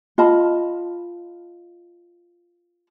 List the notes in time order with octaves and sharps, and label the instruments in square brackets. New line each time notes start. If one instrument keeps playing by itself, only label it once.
[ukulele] F4 D#5 A5 B5